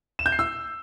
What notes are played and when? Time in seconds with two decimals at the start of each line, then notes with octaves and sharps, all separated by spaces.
0.19 E7
0.26 G6
0.32 C7
0.39 E6